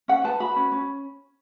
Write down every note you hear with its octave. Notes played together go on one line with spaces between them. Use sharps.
C#4 F#5
B4 A5
F#4 B5
C#4
C#4